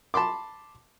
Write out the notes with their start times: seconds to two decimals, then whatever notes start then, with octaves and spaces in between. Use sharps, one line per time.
0.14 A5 B5 C6 D6